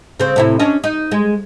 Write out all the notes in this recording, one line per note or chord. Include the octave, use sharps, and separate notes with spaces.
C#3 C4
A2 C3 E4
C#4 D4 D#5
D#4
G#3